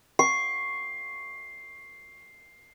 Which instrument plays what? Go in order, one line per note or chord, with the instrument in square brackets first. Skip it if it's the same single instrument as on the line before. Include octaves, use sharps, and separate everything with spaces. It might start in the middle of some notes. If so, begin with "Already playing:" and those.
[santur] C#6 [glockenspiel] C7